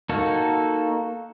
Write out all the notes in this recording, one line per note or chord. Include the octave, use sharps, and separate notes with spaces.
A#3 D#4 F#4 A4